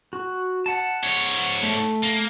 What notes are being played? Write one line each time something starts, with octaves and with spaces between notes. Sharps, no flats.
F#4
F#5 A5
G#2 C#5
A3
A#3